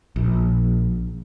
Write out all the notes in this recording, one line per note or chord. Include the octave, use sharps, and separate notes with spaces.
A#1